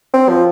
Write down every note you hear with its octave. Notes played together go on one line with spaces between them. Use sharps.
C4
F3